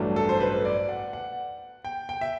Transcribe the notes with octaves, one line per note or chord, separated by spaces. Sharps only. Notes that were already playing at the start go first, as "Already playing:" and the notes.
Already playing: A1 G2 F#3 A3 D4
A4
C5
B4
D5
F#5
F#5
G5
G5
E5